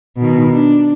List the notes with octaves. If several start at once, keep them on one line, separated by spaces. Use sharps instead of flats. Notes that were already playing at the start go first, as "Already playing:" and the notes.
B2 D#3
D4